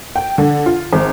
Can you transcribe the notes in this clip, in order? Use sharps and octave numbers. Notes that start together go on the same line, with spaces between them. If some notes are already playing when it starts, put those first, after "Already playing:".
G5
D3
F4
G#1